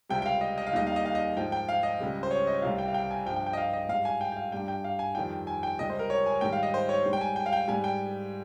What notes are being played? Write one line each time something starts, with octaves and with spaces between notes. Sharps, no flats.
C#2 C3 G3 G5
G5
F5
D#5
D#5
F5
D#2 D#3 G3 D#5
F5
D#5
F5
D#5
G#2 F3 G5
G5
F5
D#5
C#2 C#3 G3
C5
C#5
D#5
C2 C3 G3 F5
G5
F5
G5
G#5
G2 F3 G5
G5
G5
D#5
F5
D#5
G#2 G3 F5
G#5
G5
G5
F5
G2 G3 G5
G5
F5
G#5
F2 D#3 G3 G5
G#5
G5
C#2 C3 G3 D#5
C5
A#4
C#5
G#5
G#2 D#3 G3 G5
F5
D#5
C5
C#5
G#2 G3
G5
G#5
G5
F5
G5
G#2 G3 G#5
G5